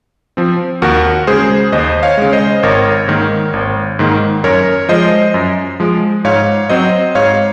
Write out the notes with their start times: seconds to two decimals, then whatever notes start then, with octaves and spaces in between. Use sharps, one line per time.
0.37 F3 C4
0.82 D#2 F#4 A#4
1.27 C#3 G#3 G#4 C5
1.72 D#2 C5 D#5
2.03 C#5 F5
2.18 C#3 G#3
2.33 C5 D#5
2.63 G#1 A#4 C#5
3.08 G#2 D#3 A#3
3.53 G#1
3.99 G#2 D#3 A#3
4.44 F#2 A#4 C#5
4.89 F3 G#3 C5 D#5
5.34 F#2
5.80 F3 G#3
6.24 G#2 C#5 F5
6.69 F#3 C4 C5 D#5
7.15 G#2 C#5 F5